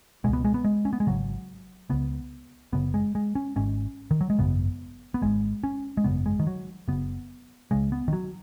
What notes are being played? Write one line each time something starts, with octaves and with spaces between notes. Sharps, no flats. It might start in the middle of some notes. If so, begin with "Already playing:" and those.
C#2 B2 G#3
B3
G#3
B3
G#3
C#4
B3
G#3
G#1 F#2 C#3 F#3
C#2 C#3 B3
F#1 F#2 C#3 B3
G#3
G#3
C#4
G#1 G#2 C#4
D#3
F#3
G#3
G#1 F#2 C#3 B3
B3
G#1 G#2 G#3
C#4
G#3
G#1 F#2 C#3 B3
G#3
D#3
F#3
F#1 F#2 C#3 B3
C#2 C#3 G#3
B3
D#3
F#3